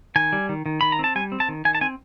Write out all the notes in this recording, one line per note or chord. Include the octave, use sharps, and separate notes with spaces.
D#3 G#5
G3
D#3
D#3
D#3 B5
A#5
C4 A5
G3 G#5
C4
A5
D#3
D#3 G#5
A5
C4 G#5